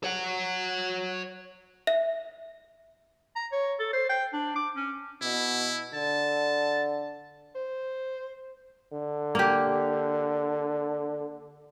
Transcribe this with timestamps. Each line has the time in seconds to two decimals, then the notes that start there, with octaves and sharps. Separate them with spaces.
0.04 C#5 F#5
1.87 E5
3.36 A#5
3.52 C#5
3.79 A4
3.93 C5
4.09 G5
4.33 D4
4.56 D6
4.76 C#4
5.22 B2 E4
5.94 D3 A5
7.55 C5
8.93 D3
9.35 A#3 G4